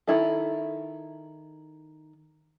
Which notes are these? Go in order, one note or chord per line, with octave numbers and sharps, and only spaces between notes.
D#3 E4 A4